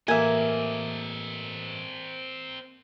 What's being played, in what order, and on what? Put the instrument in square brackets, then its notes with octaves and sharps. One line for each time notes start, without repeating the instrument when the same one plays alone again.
[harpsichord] A1 [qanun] A#3 [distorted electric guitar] C4 D#5 [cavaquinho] E5 G#5